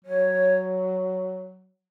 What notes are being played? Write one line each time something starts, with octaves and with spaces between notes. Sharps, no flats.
F#3 C#5